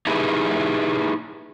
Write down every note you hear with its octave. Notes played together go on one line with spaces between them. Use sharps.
D#4 E4 G4 G#4 B4